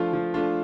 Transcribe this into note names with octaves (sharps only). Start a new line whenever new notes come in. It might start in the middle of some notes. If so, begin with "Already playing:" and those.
Already playing: F3 A3 D4 F4
F3
A3 D4 F4